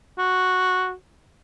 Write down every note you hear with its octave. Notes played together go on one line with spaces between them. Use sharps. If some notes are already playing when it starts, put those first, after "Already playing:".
F#4